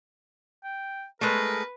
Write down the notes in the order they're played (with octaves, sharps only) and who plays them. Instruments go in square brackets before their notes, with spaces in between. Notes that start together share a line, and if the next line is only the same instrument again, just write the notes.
[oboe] G5
[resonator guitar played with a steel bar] G#3 A3 [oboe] A#4 [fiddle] B4